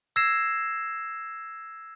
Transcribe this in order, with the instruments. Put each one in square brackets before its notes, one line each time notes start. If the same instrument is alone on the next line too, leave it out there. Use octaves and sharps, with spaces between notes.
[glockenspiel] E6 G#6 A#6 C7 E7